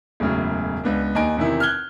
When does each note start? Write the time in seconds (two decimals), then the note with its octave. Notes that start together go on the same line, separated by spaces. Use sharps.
0.20 E1 F#2 A2 C#3
0.84 C#2 B3 D4
1.15 D#2 D#4 G#5 D7
1.37 E2 C3 D#3 E4
1.60 F6 F#6 G#6 G7